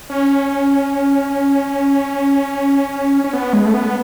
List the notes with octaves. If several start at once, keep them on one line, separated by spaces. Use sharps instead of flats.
C#4
C#4
B3
G#3
A3
B3